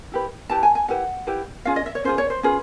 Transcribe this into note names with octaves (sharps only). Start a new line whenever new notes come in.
E4 G4 B4
E4 G4 B4 A5
G#5
G#5
E4 G4 B4 F#5
E4 G4 B4
C#4 F4 G#4 F5
D#5
E5
C#5
C#4 F4 G#4 C5
C#5
C5
C#4 F4 G#4 B4